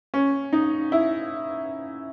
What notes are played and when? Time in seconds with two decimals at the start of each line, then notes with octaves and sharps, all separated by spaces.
0.14 C#4
0.53 D#4
0.92 E4